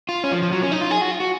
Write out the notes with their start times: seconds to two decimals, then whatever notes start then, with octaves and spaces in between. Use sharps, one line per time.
0.09 F4
0.24 C#4
0.32 F3
0.43 F3
0.52 F#3
0.62 C#4
0.72 D#4
0.81 F4
0.91 G#4
1.01 F#4
1.11 F4
1.20 F#4